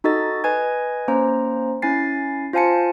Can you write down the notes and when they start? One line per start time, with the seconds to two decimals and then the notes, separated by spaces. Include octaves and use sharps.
0.04 D#4 F#4 A4 D#5 A6
0.44 B4 D#5 G#5 G#6
1.08 A#3 C#4 C5 A#5
1.82 C#4 E4 G#5 A6 C7
2.53 F4 C5 F5 G#5 A5 C#7